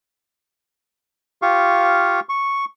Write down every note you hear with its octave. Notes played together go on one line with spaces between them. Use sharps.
F4 G4 F5 C#6
C#6